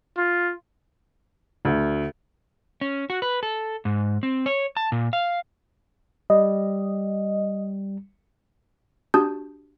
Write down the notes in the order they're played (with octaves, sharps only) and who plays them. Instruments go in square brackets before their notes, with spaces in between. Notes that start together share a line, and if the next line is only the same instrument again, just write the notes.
[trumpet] F4
[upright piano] D2
[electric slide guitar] C#4
F#4
B4
A4
G#2
C4
C#5
A5
A#2
F5
[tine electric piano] G3 [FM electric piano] D#5
[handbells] D4 F#4 G4 A5 D#6 G6